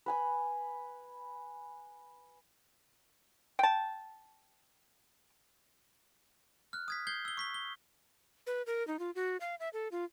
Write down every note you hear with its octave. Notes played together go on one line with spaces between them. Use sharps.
B4 G#5 B5
G5 A5
F6 F#6
D#6 G#6 B6
G6 G#6 C7 G7
E6 G7
C#6 B6 G7
G7
B4
A#4
D#4
F4
F#4
F5
E5
A4
F4